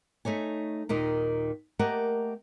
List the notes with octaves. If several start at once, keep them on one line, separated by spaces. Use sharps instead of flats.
A3 D#4 C#5 G#5
D#2 A#2 D#3 D#5
A3 A#3 G4 A#4 D#5 F#5